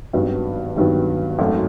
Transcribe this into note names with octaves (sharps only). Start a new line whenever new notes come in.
G#1 G2 D#3 F#3 B3
G#1 G2 D#3 F#3 B3
G#1 F#2 D#3 F#3 A3